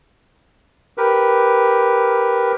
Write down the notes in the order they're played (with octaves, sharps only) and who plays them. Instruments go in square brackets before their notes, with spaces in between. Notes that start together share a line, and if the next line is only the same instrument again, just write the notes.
[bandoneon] G4 A#4 B4